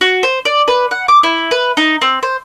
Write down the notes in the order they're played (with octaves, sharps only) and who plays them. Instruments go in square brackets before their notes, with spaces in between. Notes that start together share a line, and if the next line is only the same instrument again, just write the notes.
[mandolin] F#4
C5
D5
B4
F#5
D6
E4
B4
D#4
C4
C5